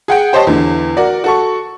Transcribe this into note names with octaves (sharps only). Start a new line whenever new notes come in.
G#4 F#5 G5
G4 C5 C#5 D#5 A5
E2 D3
F#4 A#4 D5
F#4 A4 C#6